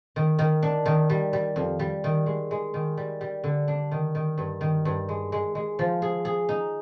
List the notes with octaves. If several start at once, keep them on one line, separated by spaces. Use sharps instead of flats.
D#3
D#3
D4
D#3
G3
G3
F2
G3
D#3
G#3
G#3
D#3
G3
G3
D3
D4
D#3
D#3
G2
D#3
G2
G#3
G#3
G#3
F3
G#4
G#4
D#4